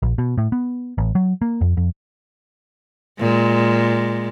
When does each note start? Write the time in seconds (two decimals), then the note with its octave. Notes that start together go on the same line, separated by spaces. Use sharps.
0.03 A#1
0.18 B2
0.38 A2
0.52 B3
0.98 A1
1.15 F#3
1.42 A#3
1.61 F2
1.77 F2
3.20 A#2 G#3